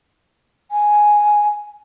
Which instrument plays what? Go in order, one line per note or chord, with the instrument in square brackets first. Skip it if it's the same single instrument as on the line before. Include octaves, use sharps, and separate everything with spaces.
[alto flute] G#5